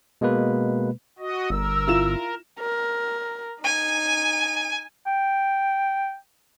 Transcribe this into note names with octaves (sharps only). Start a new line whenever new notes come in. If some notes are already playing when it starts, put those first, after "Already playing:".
B2 G#3 A#3 B4
F#4 D#5
G1 A#4 E6
E4 F4 E7
A#4
D#4 G#5
G5